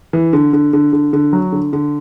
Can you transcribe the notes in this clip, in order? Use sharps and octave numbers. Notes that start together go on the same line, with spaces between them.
E3
D3
D3
D3
D3
D3
F#3
D3
D3